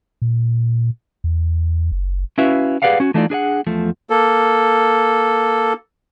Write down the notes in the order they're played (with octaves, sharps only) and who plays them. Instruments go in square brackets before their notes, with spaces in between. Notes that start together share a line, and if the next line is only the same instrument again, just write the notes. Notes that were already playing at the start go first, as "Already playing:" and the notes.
[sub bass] A#2
E2
F#1
[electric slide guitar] C#4 E4 F#4 B4 E5 F5
G4 G#4 B4 D5 F5 F#5
C#4 F#4
E3 A3 D4 D#4 F4 D5
D4 G#4 D5 F#5
E2 F3 A3
[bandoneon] A#3 A4